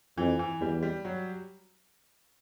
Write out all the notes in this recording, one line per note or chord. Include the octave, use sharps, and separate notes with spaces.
F2 E3
E3
E2 G3
G3
F#3